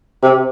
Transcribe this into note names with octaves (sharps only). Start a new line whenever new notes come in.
C3